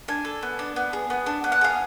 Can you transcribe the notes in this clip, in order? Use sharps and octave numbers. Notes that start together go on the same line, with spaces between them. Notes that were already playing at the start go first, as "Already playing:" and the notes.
D4 G#5
A4
B3
D4
B3
G#4
B3
D4
B3
F#5
G#4 F5